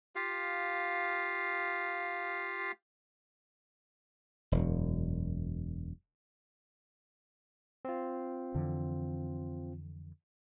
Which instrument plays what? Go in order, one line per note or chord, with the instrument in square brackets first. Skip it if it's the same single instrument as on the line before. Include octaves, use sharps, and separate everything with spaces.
[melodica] F4 G4 F5
[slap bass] E1 F#2
[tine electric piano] C4 F4
[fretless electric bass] F2 D3 E3